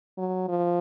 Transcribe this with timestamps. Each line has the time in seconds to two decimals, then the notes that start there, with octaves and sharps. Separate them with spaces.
0.17 F#3
0.48 F3